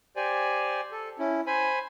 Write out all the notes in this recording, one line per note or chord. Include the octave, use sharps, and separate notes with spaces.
G4 C5 D5 G#5
A4
C#4 E4
C5 G#5 B5